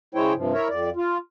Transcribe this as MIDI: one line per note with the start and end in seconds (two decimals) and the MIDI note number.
0.15 0.33 49
0.15 0.33 56
0.15 0.33 64
0.15 0.33 72
0.15 0.33 73
0.15 0.33 79
0.35 0.53 43
0.35 0.53 48
0.35 0.53 53
0.53 0.68 64
0.53 0.68 70
0.53 0.68 73
0.53 0.68 76
0.69 0.90 41
0.69 0.90 74
0.96 1.18 65